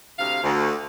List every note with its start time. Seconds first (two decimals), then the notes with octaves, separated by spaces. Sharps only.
0.19 D2 C3 F5
0.43 D2